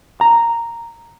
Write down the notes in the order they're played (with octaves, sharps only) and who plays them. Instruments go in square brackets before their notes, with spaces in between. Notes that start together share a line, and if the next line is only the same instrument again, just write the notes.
[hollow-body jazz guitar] A#5